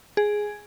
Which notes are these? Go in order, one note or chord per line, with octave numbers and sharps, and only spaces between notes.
G#4